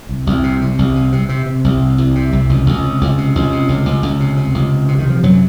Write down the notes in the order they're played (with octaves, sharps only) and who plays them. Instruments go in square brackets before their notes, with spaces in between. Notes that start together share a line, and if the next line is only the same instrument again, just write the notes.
[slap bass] C2
C2
C3
C3
C2
C3
C3
C3
C3
C2
C3
C2
C3
C2
C#2
C#2
C3
C#2
C3
C#2
C3
C#2
C#2
C#2
C3
C3
C#2
C3
C3
D#3
C3 F3
F#2 C3 F#3